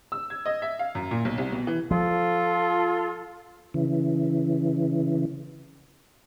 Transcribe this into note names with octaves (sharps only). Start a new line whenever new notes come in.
E6
G#6
D#5
E5
F5
F#2
A#2
B1
C2
B2
E3
F3 F4 A4
C#3 E3